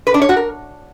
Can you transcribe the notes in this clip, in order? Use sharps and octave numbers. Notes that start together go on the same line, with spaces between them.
B4
D4
C#5
F#4
A#4